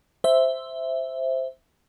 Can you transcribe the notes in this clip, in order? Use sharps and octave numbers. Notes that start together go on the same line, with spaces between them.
C5 E5